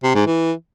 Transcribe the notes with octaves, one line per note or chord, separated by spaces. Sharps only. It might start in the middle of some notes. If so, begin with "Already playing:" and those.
C3
G#2
E3